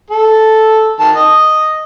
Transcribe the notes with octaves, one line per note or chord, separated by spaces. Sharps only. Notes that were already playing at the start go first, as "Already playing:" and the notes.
A4
D#3 A5
D#5